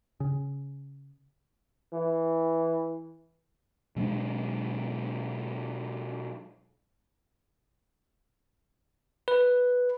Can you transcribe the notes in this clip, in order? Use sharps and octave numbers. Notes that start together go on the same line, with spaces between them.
C#3
E3
B2 F#3 G#3 D4
B4